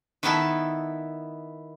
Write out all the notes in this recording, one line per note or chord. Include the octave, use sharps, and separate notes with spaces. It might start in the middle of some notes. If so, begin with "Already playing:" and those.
D#3 B3 E4 A4